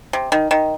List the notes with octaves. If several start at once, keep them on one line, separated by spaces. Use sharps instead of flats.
C3
D#3
D#3